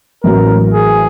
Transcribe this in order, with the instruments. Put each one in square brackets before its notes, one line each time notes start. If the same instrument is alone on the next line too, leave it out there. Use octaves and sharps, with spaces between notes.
[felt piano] A1 A2 F#3 [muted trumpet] A#4
[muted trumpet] G#4